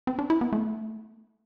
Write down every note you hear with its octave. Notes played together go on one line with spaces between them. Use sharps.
C4
D4
E4
B3
A3